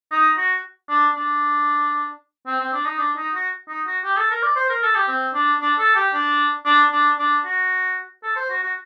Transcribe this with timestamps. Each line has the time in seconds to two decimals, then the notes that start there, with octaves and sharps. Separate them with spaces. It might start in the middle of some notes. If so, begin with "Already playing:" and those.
0.11 D#4
0.37 F#4
0.89 D4
1.15 D4
2.47 C4
2.60 C4
2.73 D4
2.85 D#4
2.98 D4
3.17 D#4
3.34 F#4
3.68 D#4
3.87 F#4
4.04 G4
4.17 A4
4.30 A#4
4.43 D5
4.56 C5
4.70 A#4
4.83 A4
4.95 G4
5.08 C4
5.34 D4
5.61 D4
5.79 A4
5.95 G4
6.13 D4
6.65 D4
6.92 D4
7.19 D4
7.45 F#4
8.23 A4
8.36 C5
8.50 F#4
8.63 F#4